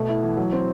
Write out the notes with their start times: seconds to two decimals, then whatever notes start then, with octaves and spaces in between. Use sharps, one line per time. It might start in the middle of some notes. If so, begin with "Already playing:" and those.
Already playing: B2 A3
0.08 E4
0.23 E3
0.37 F#3
0.53 C4